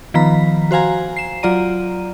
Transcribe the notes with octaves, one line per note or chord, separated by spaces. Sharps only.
D#3 F3 B3 A#5 B6
F#4 C5 F5 G#5 A#5
C7 E7
F#3 F4 D5 A#5 D#7